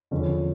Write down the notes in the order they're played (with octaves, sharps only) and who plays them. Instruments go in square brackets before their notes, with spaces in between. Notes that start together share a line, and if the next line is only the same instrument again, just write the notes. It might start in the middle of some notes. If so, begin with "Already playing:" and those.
[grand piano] E2 D3 F3 C#4